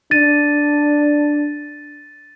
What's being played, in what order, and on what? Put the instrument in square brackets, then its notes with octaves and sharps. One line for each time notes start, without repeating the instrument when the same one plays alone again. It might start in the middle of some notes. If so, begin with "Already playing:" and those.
[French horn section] D4 [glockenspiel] A6 D#7